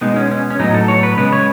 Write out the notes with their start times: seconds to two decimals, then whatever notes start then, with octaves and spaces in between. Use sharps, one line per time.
0.01 B2 G#3 B3 D#4
0.16 C#4
0.31 C#4
0.50 C#4
0.59 A2 F#3 B3 D#4
0.74 A4
0.88 C#5
1.03 B4
1.17 C#3 G#3 B3 B4
1.33 C#5